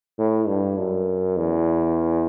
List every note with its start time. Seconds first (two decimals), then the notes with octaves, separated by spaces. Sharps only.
0.18 A2
0.48 G2
0.77 F#2
1.37 E2